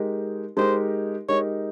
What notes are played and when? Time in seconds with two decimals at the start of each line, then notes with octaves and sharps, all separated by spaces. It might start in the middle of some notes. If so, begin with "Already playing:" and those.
Already playing: G#3 D#4 G4 A#4
0.57 G#3 D#4 G4 A#4 C5
1.29 G#3 D#4 G4 A#4 C#5